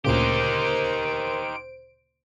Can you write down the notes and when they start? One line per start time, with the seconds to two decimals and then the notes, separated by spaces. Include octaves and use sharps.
0.05 D2 A#2 C#3 D#4 G4 A#4 C5 D7